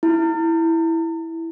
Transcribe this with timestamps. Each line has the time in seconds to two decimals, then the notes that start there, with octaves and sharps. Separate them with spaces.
0.03 E4